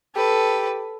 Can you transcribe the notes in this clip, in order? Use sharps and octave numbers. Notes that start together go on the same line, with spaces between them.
G4 A4 B4